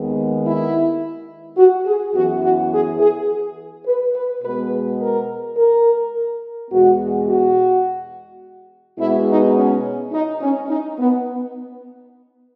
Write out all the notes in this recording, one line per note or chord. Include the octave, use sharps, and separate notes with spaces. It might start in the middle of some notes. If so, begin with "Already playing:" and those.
Already playing: D#2 D#3 G#3 B3
E4
F#4
G#4
F#2 E3 B3 F#4
F#4
G#4
G#4
B4
B4
B2 G#3 B3 B4
A#4
A#4
E2 B2 G#3 B3 F#4
F#4
B2 G#3 B3 E4
D#4
C#4
D#4
C#4
D#4
B3